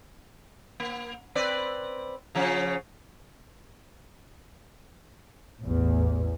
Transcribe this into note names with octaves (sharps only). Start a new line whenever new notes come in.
A#3
C4 B4 D5
C#3 F3 C#4
A1 E2